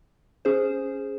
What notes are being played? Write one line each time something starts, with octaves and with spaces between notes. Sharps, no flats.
C#4 G#4 C5